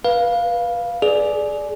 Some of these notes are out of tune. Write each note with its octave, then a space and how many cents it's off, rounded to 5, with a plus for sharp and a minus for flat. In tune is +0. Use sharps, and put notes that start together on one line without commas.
B4 -20 F5 +0
G#4 +25 D5 +0